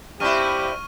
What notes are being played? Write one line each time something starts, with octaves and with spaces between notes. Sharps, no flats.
G2 C4 E4 G4 C#6 F6 D#7